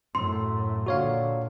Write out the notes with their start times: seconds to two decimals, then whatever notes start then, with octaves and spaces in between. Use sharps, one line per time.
0.15 F#2 A2 C6
0.86 A#2 D3 F#4 C#5 F5